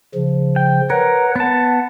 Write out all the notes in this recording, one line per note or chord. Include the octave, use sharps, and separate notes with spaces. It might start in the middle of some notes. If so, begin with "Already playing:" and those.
C#3 F3
G5
A#4 B4 C#5 F#5
B3 F#5 A5